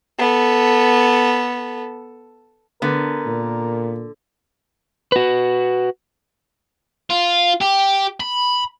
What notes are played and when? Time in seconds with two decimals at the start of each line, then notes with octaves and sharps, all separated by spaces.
0.18 B3 A4
2.82 D3 B3 A#4
3.26 A#2
5.12 F#4 B4
7.10 F4
7.61 G4
8.20 B5